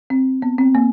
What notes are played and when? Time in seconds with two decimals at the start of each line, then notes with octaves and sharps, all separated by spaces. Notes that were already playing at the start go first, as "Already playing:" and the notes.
0.10 C4
0.42 B3
0.58 C4
0.75 A#3